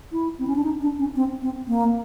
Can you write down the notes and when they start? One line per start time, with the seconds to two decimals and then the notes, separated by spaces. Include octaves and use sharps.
0.12 E4
0.39 C4
0.47 C#4
0.56 D4
0.64 D#4
0.82 D4
0.99 C#4
1.16 C4
1.42 C4
1.68 A#3